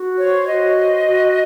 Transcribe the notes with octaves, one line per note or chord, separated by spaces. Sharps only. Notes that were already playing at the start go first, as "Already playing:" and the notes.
Already playing: F#4
C5 C#5
F#4 D#5
C5
F#4